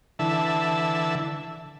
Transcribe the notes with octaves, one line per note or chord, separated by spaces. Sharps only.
D3 E3 E5 A5